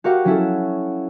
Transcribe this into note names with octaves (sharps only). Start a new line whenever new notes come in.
F#4 G4 A#4 F5 F#5
F#3 C#4 E4 A4